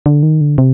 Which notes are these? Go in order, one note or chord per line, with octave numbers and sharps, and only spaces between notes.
D3
D#3
D3
C3